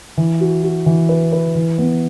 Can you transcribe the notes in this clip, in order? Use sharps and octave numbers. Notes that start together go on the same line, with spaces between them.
E3
F#4
F#4
E3
B4
B4
E3
B3